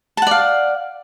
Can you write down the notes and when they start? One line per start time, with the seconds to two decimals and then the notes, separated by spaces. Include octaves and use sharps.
0.17 A5
0.22 F#5
0.27 D5
0.31 F5